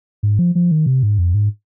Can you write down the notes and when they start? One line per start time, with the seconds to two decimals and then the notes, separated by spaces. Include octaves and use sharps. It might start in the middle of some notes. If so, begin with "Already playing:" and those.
0.23 G#2
0.39 F3
0.55 F3
0.71 D#3
0.86 C3
1.03 G#2
1.18 F2
1.34 G#2